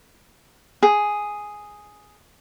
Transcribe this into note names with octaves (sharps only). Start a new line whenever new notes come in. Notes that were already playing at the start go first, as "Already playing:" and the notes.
G#4